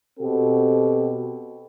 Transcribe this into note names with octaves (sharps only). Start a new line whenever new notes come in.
B2 C4 F#4 G4 A4